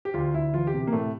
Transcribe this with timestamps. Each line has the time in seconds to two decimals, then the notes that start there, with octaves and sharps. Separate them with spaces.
0.05 G4
0.14 D2 F4
0.34 D2 E4
0.54 E3 F4
0.67 G4
0.73 C3
0.87 A#3
0.92 A2 A3